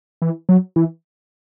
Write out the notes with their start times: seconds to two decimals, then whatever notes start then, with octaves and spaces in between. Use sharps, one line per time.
0.22 E3
0.49 F#3
0.76 E3